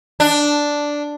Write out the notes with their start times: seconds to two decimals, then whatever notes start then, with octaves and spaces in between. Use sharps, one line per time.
0.20 D4